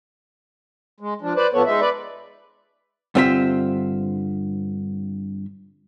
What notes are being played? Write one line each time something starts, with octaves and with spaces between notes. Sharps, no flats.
G#3
F3 D4
B4 C5 D5
A2 F3 B3 A4 C#5
G#3 D#4 E5
B4 D5
G2 D3 C4 F4 A4 E5